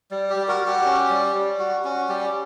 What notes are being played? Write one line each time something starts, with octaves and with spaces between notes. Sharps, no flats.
G3
G4
G3
F#4 A#4
F#4
G4
C#4
G3
G3
F#4
C#4 F#4
G3 G4